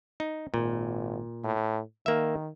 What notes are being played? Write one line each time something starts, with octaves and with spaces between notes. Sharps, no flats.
D#4
G#1 A#2
A2
D#3 A#3 E5